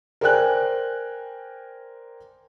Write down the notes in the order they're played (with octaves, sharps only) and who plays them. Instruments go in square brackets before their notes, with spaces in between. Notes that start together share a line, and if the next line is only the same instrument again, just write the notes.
[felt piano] A#4 C5 D5 G5 G#5 F#6